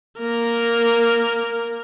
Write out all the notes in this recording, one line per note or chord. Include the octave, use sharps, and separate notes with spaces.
A#3 A#4